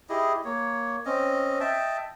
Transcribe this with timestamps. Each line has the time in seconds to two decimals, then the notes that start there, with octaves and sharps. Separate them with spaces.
0.09 E4 G4 G#4 D#5
0.45 A#3 C#5
1.05 C4 C#4 D#5
1.60 D#5 E5 G5 A5